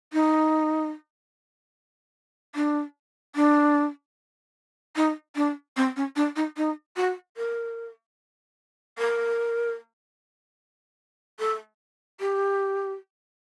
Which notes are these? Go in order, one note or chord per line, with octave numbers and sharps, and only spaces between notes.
D#4
D4
D4
D#4
D4
C4
C#4
D4
D#4
D#4
F#4
A#4
A#4
A4
G4